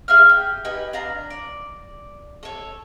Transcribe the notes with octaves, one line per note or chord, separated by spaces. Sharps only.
G#4 E5 F5 F6
G4
D#4 G4 B4 G#5
D4 F5 A#5
D5
A4 C#5